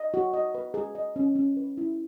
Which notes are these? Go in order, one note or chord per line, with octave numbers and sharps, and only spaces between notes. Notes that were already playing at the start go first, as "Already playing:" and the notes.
Already playing: D#5
F#4
D#5
B4
G#4
D#5
C#4
C#4
B4
E4